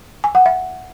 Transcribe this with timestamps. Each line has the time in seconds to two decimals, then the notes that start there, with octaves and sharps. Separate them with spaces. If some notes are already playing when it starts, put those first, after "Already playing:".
0.24 G#5
0.35 F#5
0.46 E5